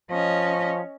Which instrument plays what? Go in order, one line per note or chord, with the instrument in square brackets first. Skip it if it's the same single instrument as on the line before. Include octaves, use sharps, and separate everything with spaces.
[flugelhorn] F3 [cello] C#4 D#5